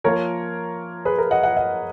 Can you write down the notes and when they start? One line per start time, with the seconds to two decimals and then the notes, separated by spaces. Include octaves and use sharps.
0.04 F3 A#3 F4 A#4 C#5
1.05 G#4 B4
1.18 A#4
1.31 D#5 F#5
1.43 D#5 F#5
1.57 D#5 F#5